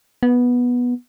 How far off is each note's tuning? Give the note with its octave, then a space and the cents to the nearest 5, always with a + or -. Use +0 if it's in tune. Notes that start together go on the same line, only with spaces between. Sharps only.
B3 -10